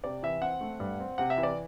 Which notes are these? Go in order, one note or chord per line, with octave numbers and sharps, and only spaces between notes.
C3 D5
E3 E5
C4 F#5
A3
G2
C4
C3 F#5
E5
E3
D5